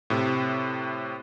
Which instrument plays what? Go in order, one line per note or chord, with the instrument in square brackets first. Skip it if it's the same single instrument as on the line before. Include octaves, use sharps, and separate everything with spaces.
[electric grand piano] A2 C3